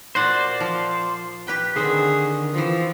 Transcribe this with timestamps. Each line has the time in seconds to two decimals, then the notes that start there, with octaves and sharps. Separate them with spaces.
0.15 A#2 F#4 C5 D5 F#5
0.60 F3
1.47 G4 B4 G5
1.76 D3 D#3 B3 C4 G#4 C5
2.54 E3 F3 C4